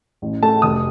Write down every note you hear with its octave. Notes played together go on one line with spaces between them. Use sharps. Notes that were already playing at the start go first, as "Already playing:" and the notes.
A1
A3 A5
F1 D#6